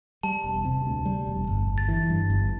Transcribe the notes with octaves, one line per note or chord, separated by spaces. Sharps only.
G3 A5
E1
C3
D2
G3
E1
G1
G1
A6
E3
G2
G1